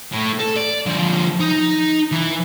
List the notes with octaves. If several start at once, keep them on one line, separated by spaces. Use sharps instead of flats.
A2
A4
D5
D3 F3
D#4
E3